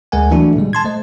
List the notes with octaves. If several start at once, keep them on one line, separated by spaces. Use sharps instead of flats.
D2 G#3 A#4 F#5 G#5
E3 F#3 A3 D4 E4 F#4
A#2 D3 G3 G#3
A5 C6 G#6
A3 C5 D#5